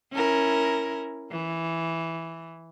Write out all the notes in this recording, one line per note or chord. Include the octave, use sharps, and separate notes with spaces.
C#4 E4 A#4
E3